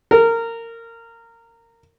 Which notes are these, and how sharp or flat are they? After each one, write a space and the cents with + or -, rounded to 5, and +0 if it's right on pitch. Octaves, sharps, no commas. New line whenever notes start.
A#4 -20